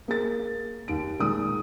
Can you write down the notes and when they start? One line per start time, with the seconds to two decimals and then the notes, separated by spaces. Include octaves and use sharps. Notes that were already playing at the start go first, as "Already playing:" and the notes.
0.08 A#3 G#4 A6
0.88 D#2 D7
1.19 A#2 D#3 G#3 D#6